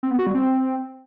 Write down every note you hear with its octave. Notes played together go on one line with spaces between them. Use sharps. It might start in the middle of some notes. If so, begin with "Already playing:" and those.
C4
B3
F#4
G3
C4